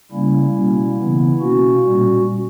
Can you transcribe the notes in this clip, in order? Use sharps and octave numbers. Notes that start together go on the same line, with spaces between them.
C#3 G3 A#3 C#4 E4
B2 G3 A#3 C#4
C#3 E3 B3
B2 A#3 C#4 F#4
A#2 G3 C#4